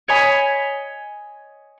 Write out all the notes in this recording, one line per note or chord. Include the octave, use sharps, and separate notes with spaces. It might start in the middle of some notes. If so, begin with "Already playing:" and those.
C#5 D#5 G#5 B5